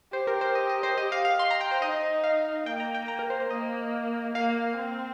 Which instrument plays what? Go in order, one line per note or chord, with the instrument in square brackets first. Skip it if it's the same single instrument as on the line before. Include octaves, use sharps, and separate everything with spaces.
[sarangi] G4 [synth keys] C5
[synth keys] A#4
C5
D#5
D#5
C5
[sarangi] G4 [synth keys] D#5
[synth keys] F5
F5
C6
A#5
G5
C5
[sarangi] D#4 [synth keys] D#5
[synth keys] F5
[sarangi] A#3 [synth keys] G5
[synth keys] A#5
G5
A#5
A#4
C5
C5
[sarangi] A#3 [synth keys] D#5
[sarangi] A#3 [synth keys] F5
[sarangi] C4